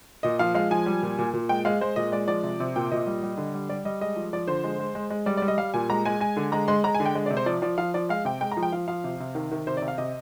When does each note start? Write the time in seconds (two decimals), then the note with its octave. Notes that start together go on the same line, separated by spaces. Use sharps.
0.23 A#2 D#5
0.39 F3 F5
0.55 G#3 F5
0.71 F3 G#5
0.86 G3
1.03 A#2
1.19 A#2
1.33 A#2
1.49 G#3 G5
1.65 G#3 F5
1.81 G#3 C5
1.96 A#2 D#5
2.12 G#3 D5
2.28 F3 D5
2.43 C3
2.60 C3
2.76 A#2 G5
2.92 A#2 D#5
3.07 G3
3.23 G3
3.38 D3
3.54 G3
3.69 G3 D5
3.85 G3 D#5
4.01 G#3 D#5
4.16 F3
4.33 F3 D5
4.48 D3 C5
4.64 G#3
4.79 G#3
4.95 G#3
5.10 G#3
5.26 G3 D5
5.37 D5
5.42 G3
5.48 D#5
5.58 G3 F5
5.74 A#2 G#5
5.90 G#3 A#5
6.05 G#3 G#5
6.20 G#3 G#5
6.37 D3
6.52 G#3 A#5
6.68 G#3 C6
6.84 G#3 A#5
6.95 G#5
7.00 D3
7.06 G5
7.15 G#3
7.26 D5
7.31 C3
7.37 C5
7.46 F3 D5
7.62 F3 D5
7.78 F3 F5
7.94 F3 D5
8.09 G#3 F5
8.25 C3 G5
8.41 G#3 G5
8.52 A#5
8.57 F3
8.63 G5
8.72 F3 F5
8.88 F3 F5
9.04 C3
9.20 C3
9.35 D#3
9.51 D#3
9.67 C3 C5
9.77 D5
9.82 C3
9.88 F5
9.98 C3 D#5